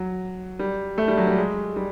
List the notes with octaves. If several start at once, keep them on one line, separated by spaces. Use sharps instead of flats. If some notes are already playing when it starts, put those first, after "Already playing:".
Already playing: F#3
G3
A3
G3
F#3
G3
G#3
G3